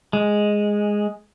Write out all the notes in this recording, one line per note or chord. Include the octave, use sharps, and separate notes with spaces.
G#3